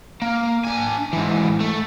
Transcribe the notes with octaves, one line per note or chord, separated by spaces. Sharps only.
A#3
D4 G#5
G#2 E3
A3